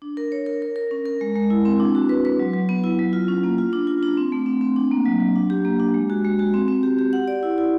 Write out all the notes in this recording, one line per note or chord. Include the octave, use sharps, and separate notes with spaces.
D4
A#4
C#5
A#4
A#4
A#4
C#4
A#4
G#3
G#3
E4
C4
D4
F#4
B4
B4
F#3
F#3
B3
E4
F#3
F4
C#4
A#3
F4
D4
F4
D4
C4
A3
C4
C4
D4
A#3
F#3
F#3
D4
G4
A#3
D4
G#3
F#4
G#3
F#4
C4
C4
G4
G4
F#5
D5
E4
E4